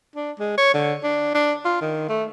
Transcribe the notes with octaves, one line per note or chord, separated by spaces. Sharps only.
D4
G#3
C#5
D3
D4
D4
F4
D#3
A3